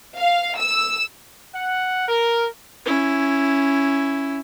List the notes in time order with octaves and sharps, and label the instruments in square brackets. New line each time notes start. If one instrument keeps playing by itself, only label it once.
[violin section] F5
E6
[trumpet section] F#5
A#4
[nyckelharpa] C#4 E4